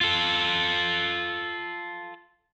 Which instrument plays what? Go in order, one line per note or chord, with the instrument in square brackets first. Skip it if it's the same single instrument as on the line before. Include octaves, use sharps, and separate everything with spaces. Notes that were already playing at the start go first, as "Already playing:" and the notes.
[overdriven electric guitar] F4 A4